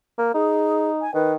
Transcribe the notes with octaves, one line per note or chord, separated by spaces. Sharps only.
A#3
D#4 G#4
G#5
D#3 B4